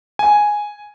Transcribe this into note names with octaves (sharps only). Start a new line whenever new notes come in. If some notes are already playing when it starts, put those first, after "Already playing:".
G#5